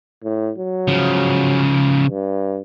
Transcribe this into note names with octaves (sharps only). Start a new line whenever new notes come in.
A2
F#3
C#3 F3
G2